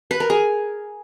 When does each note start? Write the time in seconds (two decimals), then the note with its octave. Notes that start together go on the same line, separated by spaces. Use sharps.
0.11 B4
0.20 A#4
0.30 G#4